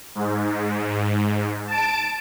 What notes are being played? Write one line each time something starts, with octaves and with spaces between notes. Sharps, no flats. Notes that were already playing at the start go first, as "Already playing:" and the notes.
G#2
A5 D7